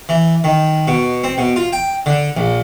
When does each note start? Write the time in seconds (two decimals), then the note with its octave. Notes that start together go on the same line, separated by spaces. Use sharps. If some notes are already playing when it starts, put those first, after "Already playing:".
0.09 E3
0.44 D#3
0.88 B2
1.24 C4
1.38 B2
1.56 F4
1.73 G5
2.06 D3
2.37 A#1